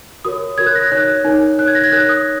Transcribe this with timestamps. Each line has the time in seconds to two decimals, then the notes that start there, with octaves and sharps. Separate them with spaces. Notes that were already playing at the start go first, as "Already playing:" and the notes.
0.25 F#4 A#4 C#5 D#6
0.58 F#4 A#4 C#5 G#6
0.66 F#6
0.75 A#6
0.83 G#6
0.92 D#4 A#4 C#5 F#6
1.25 D#4 A#4 C#5
1.58 D#4 A#4 C#5 F#6
1.68 G#6
1.75 A#6
1.84 G#6
1.92 D#4 A#4 C#5 F#6
2.09 D#6